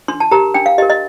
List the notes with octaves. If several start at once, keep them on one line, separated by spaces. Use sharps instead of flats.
D4 C6
A5
G4 A#4 A#5
D4 G5
F5
G4 A#4 D#5
D#5